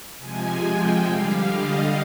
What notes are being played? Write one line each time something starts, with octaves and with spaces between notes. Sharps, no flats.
C3 F3 G#3 G#5
G5
D3 G3 F5
D#5